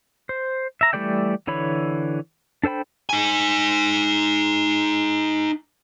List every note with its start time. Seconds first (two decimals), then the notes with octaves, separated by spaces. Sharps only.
0.29 C5
0.81 E5 A#5
0.93 E3 G3 A3 D5 G5
1.47 D3 E3 C#5 B5
2.63 D4 A4 C5 G5 B5
3.09 D#4 G#5